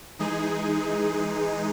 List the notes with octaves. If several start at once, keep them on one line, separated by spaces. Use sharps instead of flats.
E3 G#3 D#4 G#4